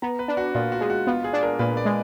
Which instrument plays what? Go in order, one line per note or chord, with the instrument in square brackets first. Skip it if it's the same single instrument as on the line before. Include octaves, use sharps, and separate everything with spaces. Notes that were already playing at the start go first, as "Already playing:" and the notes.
[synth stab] B3 [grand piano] A#5
[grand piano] B4
[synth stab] D4
[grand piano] F#4
[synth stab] A#2 [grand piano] F4
[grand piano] F#4
[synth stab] G#3
[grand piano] F#4
[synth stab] B3 [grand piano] F4
[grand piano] G#4
[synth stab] D4
[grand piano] A#4
[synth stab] A#2 [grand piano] B4
[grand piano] D5
[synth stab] G#3